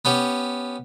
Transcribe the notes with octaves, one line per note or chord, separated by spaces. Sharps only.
B3 C#4 G4